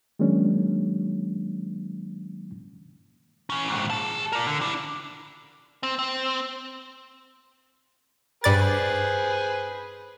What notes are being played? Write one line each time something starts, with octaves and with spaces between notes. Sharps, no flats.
D#3 F#3 G#3 A#3 C#4 D4
E3 C#4
D#2 G#2
G#4 A5
A#4 D5
D3
D4 E4
C4
C4
G2 G#4 B4 C5 D5 A6